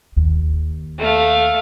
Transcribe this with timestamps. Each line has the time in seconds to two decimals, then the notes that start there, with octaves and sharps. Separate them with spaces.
0.16 D#2
0.99 A3 F5